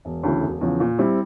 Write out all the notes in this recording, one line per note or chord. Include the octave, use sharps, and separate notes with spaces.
E1
D2 C#3 E3 A3
E1
E2 C#3 F3
A#2
G3 C4 E4